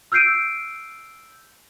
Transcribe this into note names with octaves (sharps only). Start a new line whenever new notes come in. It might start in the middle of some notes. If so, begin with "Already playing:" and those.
E6 F6 G6 C7 D7 D#7